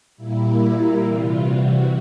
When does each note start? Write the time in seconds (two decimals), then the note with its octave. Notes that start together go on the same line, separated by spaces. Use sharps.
0.17 A#2 G3 A#3 E4
1.01 C3 E3 G3 F4
1.42 F#4